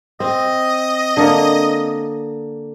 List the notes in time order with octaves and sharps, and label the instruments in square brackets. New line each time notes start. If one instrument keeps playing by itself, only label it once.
[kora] C4 [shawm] D#5
[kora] D3 A#3